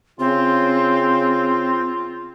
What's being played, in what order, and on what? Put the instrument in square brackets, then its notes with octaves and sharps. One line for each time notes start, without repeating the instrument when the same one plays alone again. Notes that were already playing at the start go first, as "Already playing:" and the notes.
[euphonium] C#3 [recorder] C4 [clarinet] F4